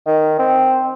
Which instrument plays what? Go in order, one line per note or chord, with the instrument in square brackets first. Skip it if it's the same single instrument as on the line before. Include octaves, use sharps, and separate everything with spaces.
[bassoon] D#3
C4